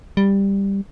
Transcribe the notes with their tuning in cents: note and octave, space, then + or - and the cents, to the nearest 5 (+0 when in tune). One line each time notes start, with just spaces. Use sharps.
G3 +10